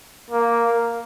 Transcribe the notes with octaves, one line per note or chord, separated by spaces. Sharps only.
A#3